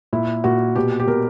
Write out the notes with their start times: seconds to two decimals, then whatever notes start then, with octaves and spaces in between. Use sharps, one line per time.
0.13 A#2 E4
0.44 A#2 F#4
0.75 B2 G4
1.00 G4
1.07 B2 A#4